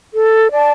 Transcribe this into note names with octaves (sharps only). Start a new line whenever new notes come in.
A4
D5 A5